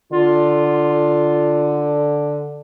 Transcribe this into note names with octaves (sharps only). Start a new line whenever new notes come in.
D3 F4